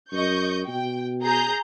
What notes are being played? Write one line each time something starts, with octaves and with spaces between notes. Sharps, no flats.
F#2 D#5 C#6 G6
B2 G5
G#4 A#5 G6